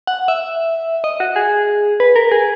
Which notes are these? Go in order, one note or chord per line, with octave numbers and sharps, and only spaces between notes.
F#5
E5
D#5
F#4
G#4
B4
A#4
G#4